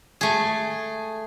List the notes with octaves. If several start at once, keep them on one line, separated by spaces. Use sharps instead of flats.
A3 G#4